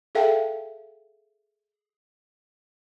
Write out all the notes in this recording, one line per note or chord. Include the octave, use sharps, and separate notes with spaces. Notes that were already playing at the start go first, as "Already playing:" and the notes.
G#4 A4 E5 F5 G5 A5